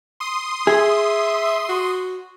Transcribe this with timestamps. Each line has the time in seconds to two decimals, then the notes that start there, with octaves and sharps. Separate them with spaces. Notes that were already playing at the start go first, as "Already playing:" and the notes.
0.20 C6 D#6
0.67 G#4 E5
1.69 F#4